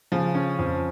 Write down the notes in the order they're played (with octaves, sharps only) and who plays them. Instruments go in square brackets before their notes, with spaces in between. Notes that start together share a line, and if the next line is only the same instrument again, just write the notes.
[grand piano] C#3 [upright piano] F3
[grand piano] C#4
F2